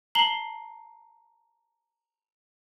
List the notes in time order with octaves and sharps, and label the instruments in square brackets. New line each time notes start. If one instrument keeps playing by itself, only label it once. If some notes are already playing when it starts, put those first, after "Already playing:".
[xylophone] A5 A#5 C7 F#7 G7